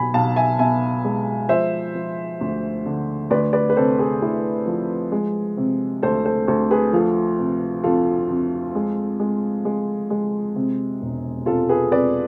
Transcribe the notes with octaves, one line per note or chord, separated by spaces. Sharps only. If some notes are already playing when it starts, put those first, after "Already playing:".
Already playing: B1 G#5 B5
B1 F5 A5
E5 G#5
B2 E5 G#5
G#3
F3 C5 E5
F3
D2
D3
D2 B4 D5
B4 D5
B4
C3 A4 C5
G#4 B4
D2 E4 G#4
F3
G#3
C3
D2 A4 C5
A4 C5
D2 A4 C5
G#4 B4
F3 F4 A4
C3
F2 F4 A4
F2
G#3
G#3
G#3
G#3
C3
E1
C3 F4 A4
G#4 B4
C3 B4 D5